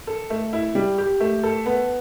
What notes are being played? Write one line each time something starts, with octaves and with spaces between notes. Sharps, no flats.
A4
A3
E4
G3
G4
A3
A4
B3